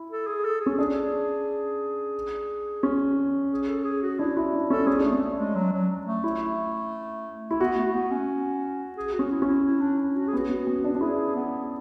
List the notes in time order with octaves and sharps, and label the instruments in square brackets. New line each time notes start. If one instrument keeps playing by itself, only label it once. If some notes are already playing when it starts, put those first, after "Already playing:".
Already playing: [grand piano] E4
[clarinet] A4
G#4
A4
G#4
[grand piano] C#4
[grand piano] D4 [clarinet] G#4
[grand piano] C#4
[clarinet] G#4
A4
G#4
F#4
[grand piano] D4 [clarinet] E4
[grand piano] E4 [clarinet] F#4
[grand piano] D4
[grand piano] C#4 [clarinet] A4
[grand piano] C#4 [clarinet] G#4
[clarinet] A3 [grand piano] D4
[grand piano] C#4
[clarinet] A3
G#3
F#3
F#3
A3
[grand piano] E4
E4
[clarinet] B3 [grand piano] F#4
[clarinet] A3
B3
C#4
G#4
F#4
[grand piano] C#4
[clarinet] E4
[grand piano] C#4
[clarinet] E4
E4
D4
E4
F#4
G#4
[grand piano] B3 [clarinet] F#4
[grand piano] C#4
B3
D4
D4
[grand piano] E4 [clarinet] G#4
[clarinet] B3